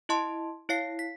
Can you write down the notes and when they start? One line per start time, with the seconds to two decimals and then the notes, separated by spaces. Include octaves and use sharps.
0.09 E4 D#5 A5 C6
0.69 E4 C#5 F5 C7
0.99 B6